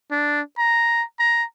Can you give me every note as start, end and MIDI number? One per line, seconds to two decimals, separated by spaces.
0.11 0.41 62
0.58 1.03 82
1.19 1.44 82